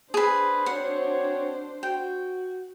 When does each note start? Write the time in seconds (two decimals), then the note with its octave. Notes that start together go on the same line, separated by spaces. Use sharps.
0.14 D4 G#4 B4 C5
0.66 C4 F#4 C#5 F#5
1.83 F#4 G5